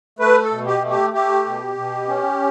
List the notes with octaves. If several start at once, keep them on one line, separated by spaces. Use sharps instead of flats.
A3 B4
A4
B2
G4
A3
G4
A3 G4
B2
B2
C#4